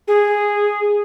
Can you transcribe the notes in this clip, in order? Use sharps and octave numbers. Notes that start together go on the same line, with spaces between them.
G#4